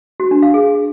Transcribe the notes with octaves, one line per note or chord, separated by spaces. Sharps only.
F#4
D4
F5
G#4